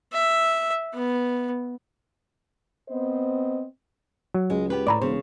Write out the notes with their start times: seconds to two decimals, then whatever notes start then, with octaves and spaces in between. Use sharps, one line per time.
0.13 E5
0.94 B3
2.89 B3 C4 C5 D#5
4.34 F#3
4.50 C#2 G#3
4.70 B3 G4 B4
4.87 A2 D5 A#5 B5 D6
5.02 E1 C#3 C5